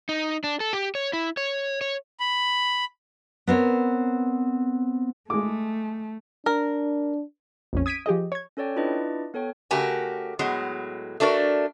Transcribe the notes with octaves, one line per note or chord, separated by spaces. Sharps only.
D#4
D4
A4
G4
C#5
E4
C#5
C#5
B5
B3 C4 A#4 C#5
G#3 A3 D6
D4 A#4
A#1 F2 C#4
D#6 G#6 B6 D7 D#7
F3 G4 G#4 D#5
C#5 G#6
C#4 A4 C#5 D5 G5
D4 E4 F4 B4 D5 D#5
B3 A4 C#5 G5
C#3 A3 F#4 G4 A#4 G#5
A2 F#3 G#3 B3
A3 D4 F#4 A#4 D5